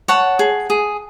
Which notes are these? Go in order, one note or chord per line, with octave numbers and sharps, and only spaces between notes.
C#5 F#5 A5
G#4
G#4